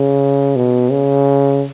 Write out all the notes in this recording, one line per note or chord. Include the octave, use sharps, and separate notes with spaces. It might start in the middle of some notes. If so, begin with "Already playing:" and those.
Already playing: C#3
B2
C#3